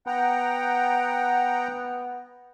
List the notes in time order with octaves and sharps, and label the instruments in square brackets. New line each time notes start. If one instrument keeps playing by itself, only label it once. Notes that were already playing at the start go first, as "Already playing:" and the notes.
[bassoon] B3 [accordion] F#5 G5 A#5